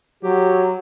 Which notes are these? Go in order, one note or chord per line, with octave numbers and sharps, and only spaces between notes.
F#3 G4